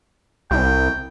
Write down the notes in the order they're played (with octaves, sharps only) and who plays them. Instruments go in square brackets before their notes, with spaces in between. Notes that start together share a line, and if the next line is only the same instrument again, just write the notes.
[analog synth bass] C2 [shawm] G5